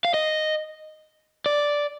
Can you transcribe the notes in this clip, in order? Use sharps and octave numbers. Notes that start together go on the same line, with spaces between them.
F5
D#5
D5